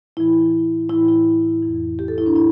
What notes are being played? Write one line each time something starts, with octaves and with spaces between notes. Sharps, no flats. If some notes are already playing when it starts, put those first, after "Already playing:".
A2 E3 E4
A2 E3 E4
E4
F2 E3
G4
A4
E4
D4
A2 E4